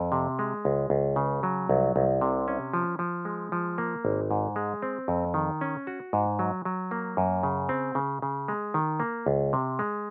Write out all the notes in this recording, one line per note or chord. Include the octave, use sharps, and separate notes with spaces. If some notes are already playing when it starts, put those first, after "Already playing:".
Already playing: F2
C3
G#3
C#2
C#2
C#3
F#3
C2
C2
C3
C#4
F3
F3
G#3
F3
A#3
G#1
G#2
G#3
C4
F2
D#3
C#4
F#4
G#2
F#3
F#3
A#3
F#2
C#3
C4
C#3
C#3
G#3
D#3
A#3
C#2
C3
G#3